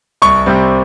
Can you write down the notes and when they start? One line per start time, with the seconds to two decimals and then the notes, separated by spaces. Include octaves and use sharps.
0.22 C2 C#6
0.46 C3 G3 C4